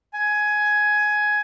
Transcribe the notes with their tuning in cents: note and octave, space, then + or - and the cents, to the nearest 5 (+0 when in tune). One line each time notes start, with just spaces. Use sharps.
G#5 +15